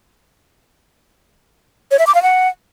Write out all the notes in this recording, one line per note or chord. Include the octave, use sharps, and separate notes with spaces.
C#5
E5
D6
F5
F#5